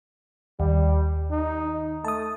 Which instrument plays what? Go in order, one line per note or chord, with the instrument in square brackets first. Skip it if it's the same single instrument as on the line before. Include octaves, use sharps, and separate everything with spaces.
[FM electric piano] D#2 [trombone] G3
[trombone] D#4
[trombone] A3 [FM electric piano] A5 D#6